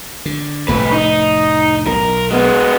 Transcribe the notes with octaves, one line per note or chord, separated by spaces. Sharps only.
D3
F1 A2 D3 A3 B4
D#4
B1 A#4
G#3 B3